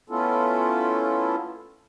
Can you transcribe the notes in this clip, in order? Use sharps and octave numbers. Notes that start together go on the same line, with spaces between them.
A3 B3 C#4 E4 F4 A4